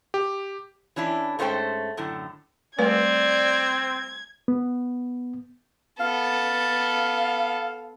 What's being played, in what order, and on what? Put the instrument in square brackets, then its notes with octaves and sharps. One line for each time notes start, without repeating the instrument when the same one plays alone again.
[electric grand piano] G4
[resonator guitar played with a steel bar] E3 C#4 D4 E4
G#2 A3 C#4 C5 G5
F#2 A2 D3
[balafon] G3 A3 B4 [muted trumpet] C4 [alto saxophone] D5 [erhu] G#6
[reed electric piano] B3
[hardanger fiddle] B3 A4 [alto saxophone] F5